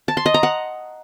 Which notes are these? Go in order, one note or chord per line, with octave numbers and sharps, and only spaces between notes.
A5
C6
D#5
A#5
F#5